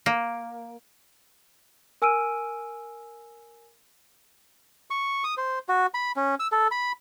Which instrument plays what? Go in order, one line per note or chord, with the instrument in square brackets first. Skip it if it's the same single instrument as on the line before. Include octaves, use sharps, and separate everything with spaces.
[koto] A#3
[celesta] A#4 G#5 E6 F6 D7 D#7
[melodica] C#6
D#6
C5
F#4
B5
C#4
E6
A4
B5